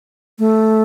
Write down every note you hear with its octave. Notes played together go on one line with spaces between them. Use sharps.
A3